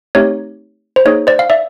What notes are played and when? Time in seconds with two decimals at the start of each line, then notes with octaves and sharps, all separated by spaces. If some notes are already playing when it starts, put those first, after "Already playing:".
0.15 A3 C4 D#4 G4 C#5
0.96 C5
1.05 A#3 D#4 G#4 C#5
1.27 C5 D5
1.39 F5
1.50 D5 E5